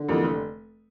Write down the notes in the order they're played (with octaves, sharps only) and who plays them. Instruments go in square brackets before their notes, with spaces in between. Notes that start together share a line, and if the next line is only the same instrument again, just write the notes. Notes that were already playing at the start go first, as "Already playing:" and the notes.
Already playing: [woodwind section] D3
[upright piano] F2 E3 G3 A#3
F1